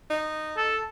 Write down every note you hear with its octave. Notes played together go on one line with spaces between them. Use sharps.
D#4
A4